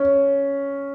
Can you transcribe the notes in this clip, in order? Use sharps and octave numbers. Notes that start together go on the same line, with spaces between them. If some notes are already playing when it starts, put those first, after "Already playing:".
Already playing: C#4